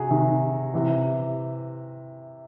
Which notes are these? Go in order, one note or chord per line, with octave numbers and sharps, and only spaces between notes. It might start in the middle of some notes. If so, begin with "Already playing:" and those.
Already playing: C3 F#4 G#4
C3 D#3
C3 E3